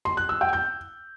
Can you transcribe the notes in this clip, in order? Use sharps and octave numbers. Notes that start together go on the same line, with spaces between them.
C6
F#6
E6
G5
G6